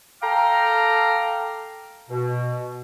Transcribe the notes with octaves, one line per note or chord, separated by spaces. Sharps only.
A4 F5 G5 A#5 D6 F6
B2